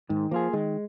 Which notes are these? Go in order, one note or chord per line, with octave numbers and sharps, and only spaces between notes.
G#2 D#3
F3 A#3 F4 G#4
D#3 G#3